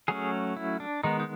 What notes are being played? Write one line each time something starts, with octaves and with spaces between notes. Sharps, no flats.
F#3 A3 C#4 G#4
E4
D4
D#3 G#3 B3 D#4
D#4